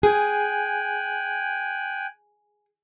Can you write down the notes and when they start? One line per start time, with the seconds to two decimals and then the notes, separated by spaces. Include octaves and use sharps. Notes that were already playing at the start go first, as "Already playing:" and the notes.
0.03 G#4 G5 G#5 F#6